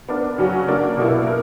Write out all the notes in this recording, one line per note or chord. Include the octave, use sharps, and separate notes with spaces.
B3 D4 A#4 D5
C#3 F#3 C#4 F#4
A#3 D4 A#4 D5
B2 A#3 E4
A#4